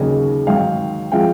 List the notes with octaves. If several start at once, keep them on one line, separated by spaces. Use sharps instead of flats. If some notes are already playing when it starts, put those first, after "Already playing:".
Already playing: D#2 C#3 F#3 C#5 D#5
G#2 D#3 F#3 F5 G5
F3 G#3 F5 G5